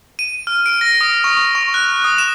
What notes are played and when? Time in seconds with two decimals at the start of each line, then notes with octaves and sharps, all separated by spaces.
0.19 D#7
0.47 F6
0.66 D7
0.81 A#6
1.01 D#6
1.24 C#6
1.55 C#6
1.74 F#6
2.04 D#6
2.18 E7